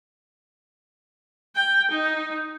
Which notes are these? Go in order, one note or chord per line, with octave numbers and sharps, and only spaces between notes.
G5
D#4